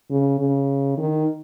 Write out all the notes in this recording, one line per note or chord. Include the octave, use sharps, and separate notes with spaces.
C#3
C#3
D#3